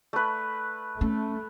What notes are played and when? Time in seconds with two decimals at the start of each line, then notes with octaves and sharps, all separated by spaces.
0.13 A3 B4
1.01 A3 C#4